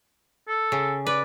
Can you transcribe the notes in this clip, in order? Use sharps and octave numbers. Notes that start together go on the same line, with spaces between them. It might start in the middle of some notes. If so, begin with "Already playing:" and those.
A4
C#3
B4 D5